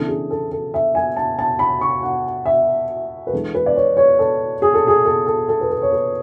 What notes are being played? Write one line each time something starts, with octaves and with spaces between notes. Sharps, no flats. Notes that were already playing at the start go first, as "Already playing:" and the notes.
Already playing: C#3 E3 B3 D4 A4
G#4
A4
A4
E5
G#5
A5
A5
B5
C#6
F#5
E5
B4
E3 G#3 D4 A4
B4
D5
C#5
C#5
A4
G#4
A4
G#4
A4
A4
A4
B4
A4
C#5
B4